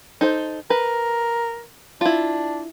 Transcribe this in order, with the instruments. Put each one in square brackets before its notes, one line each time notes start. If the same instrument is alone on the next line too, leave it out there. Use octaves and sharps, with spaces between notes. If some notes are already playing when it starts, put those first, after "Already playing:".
[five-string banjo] D#4 A4 C5
[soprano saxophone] A#4 [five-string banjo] B4
[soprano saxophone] D4 [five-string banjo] E4 F4